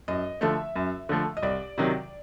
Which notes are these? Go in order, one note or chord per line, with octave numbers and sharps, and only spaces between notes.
F#2 D#5
D3 F3 A3 E5
F#2
D3 F3 A3
D#5
C2 D5
C3 D#3 F#3